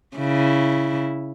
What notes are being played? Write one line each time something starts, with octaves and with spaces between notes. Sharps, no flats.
C#3 E4